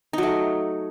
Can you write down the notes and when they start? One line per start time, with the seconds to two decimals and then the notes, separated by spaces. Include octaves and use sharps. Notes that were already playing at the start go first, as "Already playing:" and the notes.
0.13 D#4
0.18 F#3
0.23 A3